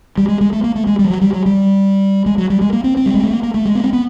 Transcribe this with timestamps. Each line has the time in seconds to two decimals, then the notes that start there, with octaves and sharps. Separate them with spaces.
0.18 G3
0.28 G#3
0.41 G#3
0.53 A3
0.64 A#3
0.76 A3
0.87 G#3
0.99 G3
1.04 F3
1.10 F#3
1.21 G3
1.33 F#3
1.46 G3
2.26 G#3
2.38 F#3
2.50 G3
2.61 G#3
2.73 A#3
2.84 C4
2.97 C4
3.06 G3
3.14 G#3
3.23 A3
3.31 A#3
3.43 A#3
3.54 A3
3.65 G#3
3.75 B3
3.84 C4
3.93 B3